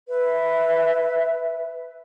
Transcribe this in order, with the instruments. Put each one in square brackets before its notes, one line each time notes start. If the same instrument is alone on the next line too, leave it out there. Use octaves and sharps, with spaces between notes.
[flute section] B4 E5